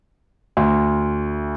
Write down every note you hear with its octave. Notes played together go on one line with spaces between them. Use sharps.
D2